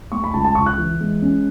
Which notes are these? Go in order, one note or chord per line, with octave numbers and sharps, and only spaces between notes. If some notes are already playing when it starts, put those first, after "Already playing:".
A3 C#6
B5
C#2 A5
A5
C#2 C#6
F#6
E3
G#3
C#4